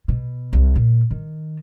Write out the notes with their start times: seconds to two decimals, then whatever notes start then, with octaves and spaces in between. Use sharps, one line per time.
0.08 B2
0.53 C2
0.76 A#2
1.11 D#3